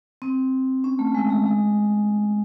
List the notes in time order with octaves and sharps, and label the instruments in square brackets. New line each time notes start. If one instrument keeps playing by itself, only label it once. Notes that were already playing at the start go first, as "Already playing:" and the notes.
[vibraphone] C4
C#4
A3
G#3
G#3
G#3